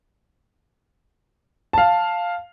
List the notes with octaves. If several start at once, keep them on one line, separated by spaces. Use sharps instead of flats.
F5 A5